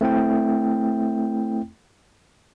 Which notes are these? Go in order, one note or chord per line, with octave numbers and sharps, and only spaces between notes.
A3 C4 E4 G5